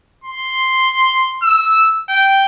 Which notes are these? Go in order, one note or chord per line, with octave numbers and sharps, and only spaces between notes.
C6
E6
G5